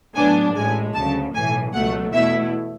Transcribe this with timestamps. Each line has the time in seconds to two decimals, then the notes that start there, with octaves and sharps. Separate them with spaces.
0.15 A2 F#3 B3 D4 G#5
0.54 A1 A2 G#3 G#5
0.94 D2 C#3 F#3 A5
1.34 B1 A2 E3 G#5
1.74 C#2 B2 F#3 A3 F#5
2.13 E2 B2 A3 E4 E5